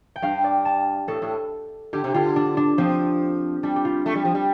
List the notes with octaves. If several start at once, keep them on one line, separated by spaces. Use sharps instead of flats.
G5
G2 F5
D5
A5
A2 A4
A2
D3 G4
C3
D3 F4
D4
D4
F3 C4
G3 D4
G4
F4
A3
G3
F3
G3